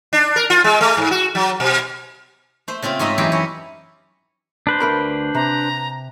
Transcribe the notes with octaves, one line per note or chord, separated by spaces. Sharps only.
D4
A#4
F4
G#3
A3
G#2
F#4
F#3
B2
A3 C5
C#3 A3 C4 F4
G#2 A3 D#4 D#5 E5
F#2 E3 G4 G#4 G5
E4 C#5 D#5
D4 B4 C5
D2 A#4 B5
C3 A#5